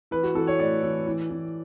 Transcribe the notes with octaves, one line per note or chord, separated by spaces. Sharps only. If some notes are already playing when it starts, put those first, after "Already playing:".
E3 B4
F#4
E3 A4
C#5
A2 D5
E3
E3
E3